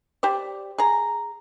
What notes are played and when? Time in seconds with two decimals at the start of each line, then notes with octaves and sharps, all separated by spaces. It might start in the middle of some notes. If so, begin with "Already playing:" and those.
0.23 G4 C5 D5
0.78 G#4 A#5